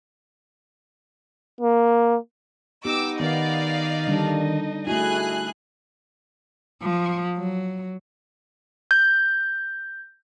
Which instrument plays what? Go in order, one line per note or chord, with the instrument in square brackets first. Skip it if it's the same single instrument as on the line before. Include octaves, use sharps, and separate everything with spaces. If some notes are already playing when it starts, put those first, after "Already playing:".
[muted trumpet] A#3
[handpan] B3 G4 [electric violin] D#4 D#5 [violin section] D6 E6
[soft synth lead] D#3 [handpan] B3 [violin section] D5 F5
[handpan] D3 G3 D4
[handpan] A3 E4 [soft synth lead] F#4 [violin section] G#4 G#5 F#6
[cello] F3
F#3
[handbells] G6